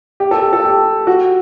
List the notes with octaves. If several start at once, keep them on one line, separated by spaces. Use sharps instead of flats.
G4
A4
G4
A4
G4
F#4